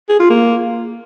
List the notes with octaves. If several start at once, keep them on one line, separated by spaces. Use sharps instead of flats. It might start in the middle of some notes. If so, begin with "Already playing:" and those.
G#4
F4
A#3